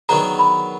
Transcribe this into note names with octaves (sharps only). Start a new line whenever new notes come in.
D#3 F#3 B3 D4 G#4 A#5
B5